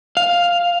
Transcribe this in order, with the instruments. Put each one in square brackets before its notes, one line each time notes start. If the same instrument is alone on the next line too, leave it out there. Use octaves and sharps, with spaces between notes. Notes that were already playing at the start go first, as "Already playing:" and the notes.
[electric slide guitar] F5